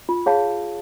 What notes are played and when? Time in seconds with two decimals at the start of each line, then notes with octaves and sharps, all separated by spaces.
0.09 F4
0.26 G#4 C#5 F5 A5